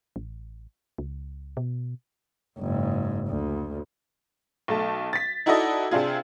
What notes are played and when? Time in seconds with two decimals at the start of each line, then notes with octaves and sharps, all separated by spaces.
0.16 A1
0.98 C#2
1.57 B2
2.58 F#1 G#2
3.27 D2
4.68 B1 A3 A5
5.13 A6 B6
5.46 D#4 E4 F#4 A4 D5 D#5
5.91 C3 D4 F4 G#4